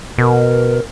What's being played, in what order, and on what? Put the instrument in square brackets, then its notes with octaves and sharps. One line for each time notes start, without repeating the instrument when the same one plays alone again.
[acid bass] B2 [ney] A#4